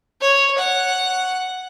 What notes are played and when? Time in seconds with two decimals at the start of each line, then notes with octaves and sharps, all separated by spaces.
0.21 C#5
0.58 F#5